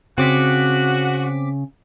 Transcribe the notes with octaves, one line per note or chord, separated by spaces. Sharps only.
C#3 C4 C#4 F#4 D6 B6